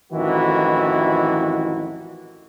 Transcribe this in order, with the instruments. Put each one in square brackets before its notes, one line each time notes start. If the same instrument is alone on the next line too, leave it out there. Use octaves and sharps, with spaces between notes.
[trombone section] A1 F2 D#3 E3 E4 F#4